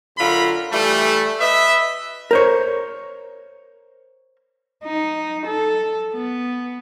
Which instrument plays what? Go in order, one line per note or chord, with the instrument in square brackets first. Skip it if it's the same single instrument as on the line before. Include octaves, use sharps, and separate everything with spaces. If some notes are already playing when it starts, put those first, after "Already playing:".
[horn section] F#2 D3 F4 A#4 B5
E3 G3 A3
B4 D#5 E5
[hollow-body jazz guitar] A#4 C5 C#5
[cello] D#4
A4
B3